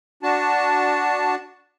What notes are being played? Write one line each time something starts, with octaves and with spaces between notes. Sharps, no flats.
D4 F#4 A5